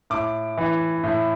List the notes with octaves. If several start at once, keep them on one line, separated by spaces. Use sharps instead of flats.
A2 D6
E3
A2